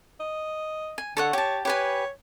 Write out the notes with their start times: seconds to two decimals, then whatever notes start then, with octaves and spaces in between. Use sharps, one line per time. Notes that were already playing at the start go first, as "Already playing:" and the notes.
0.20 D#5
0.98 G#5
1.17 D3 A4 C#5 F#5
1.33 G4 C#5 A5
1.65 G4 B4 C#5 G#5